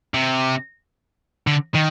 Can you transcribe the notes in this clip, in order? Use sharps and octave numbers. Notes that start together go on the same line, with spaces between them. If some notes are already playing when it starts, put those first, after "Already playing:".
C3
D3
D#3